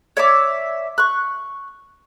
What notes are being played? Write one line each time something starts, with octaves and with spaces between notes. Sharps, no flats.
C#5 D5 E5 D6
C#6 F#6